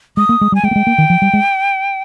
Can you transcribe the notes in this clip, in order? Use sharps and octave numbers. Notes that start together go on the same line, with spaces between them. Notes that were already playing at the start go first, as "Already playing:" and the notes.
G#3 D#6
A#3
G#3
G3
G#5
G#3 G5
A#3
G#3
A#3
D#3
F3
G3
G#3